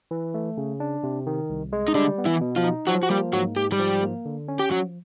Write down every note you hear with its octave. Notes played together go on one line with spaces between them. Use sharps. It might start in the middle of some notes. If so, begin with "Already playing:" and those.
E3
A3
C#3
D4
C3
D#3
C2
G#3
D#4
D3 G3 D4
B3
E3 E4
B2
F3 F4
D#4
F3 F#3 F#4
F#4
G3 A#3 G4
G#2 F#3 F#4
G#2 G4
G3 G4
F3
A#3
D3
C#4
G4
F3 F#3 F#4